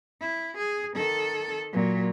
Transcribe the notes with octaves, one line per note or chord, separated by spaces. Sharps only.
E4
G#4
D#3 A4
A#2 F#3